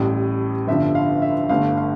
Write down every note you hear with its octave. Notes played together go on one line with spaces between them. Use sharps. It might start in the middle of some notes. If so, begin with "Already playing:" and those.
Already playing: A1 A2 G3
G1 G2 D3 F3 E5
F5
E5
G1 G2 D3 A3 F5
F5